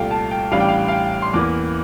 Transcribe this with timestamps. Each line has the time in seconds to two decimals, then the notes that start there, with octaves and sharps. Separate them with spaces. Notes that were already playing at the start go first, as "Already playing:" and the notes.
Already playing: C2 A#2 A3 F5 G5
0.11 A5
0.31 G5
0.51 A1 A2 G3 D4 F5
0.60 G5
0.68 F5
0.88 F5
0.92 G5
1.22 C6
1.33 E2 E3 A#3 D6